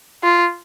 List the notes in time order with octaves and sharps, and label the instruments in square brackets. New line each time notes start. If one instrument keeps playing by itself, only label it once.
[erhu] F4